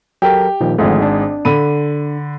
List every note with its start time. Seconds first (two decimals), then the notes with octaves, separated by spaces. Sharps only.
0.22 F#3 G4 A4 A#4
0.61 A#2 D#3 F3
0.78 G#1 G#2 D3 F3 A3
1.02 D4
1.45 D3 B5 D#7